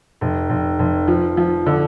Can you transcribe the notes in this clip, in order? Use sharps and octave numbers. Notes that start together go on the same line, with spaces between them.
F1
F1
F1
F3
F3
D3